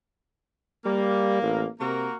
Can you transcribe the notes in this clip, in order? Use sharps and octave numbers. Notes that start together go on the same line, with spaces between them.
G3 A#3
A1
C3 A#3 F#4 A#4